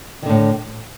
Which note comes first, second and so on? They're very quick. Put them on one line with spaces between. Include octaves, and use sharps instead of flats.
D#3 D3 A2